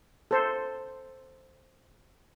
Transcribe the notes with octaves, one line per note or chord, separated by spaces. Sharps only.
A4 C5